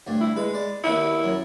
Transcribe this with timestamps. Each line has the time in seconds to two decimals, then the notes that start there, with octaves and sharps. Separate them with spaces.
0.07 D2 G2
0.21 E4
0.36 G#3 B4
0.54 D5
0.84 D#2 E4 B4 D#6
1.24 F#2